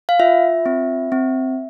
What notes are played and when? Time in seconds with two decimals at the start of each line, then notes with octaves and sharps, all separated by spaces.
0.09 F5
0.20 F4 E5
0.66 C4
1.12 C4